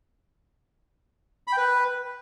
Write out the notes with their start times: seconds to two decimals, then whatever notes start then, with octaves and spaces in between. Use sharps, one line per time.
1.47 B5
1.52 G5
1.57 B4